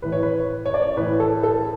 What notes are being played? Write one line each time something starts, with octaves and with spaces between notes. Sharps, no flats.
A2 E3 B4
C#5
B4
C#5
D5
C#5
A2 E3 B4
A4
A4